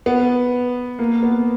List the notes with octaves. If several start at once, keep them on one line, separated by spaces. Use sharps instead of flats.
B3
A#3
B3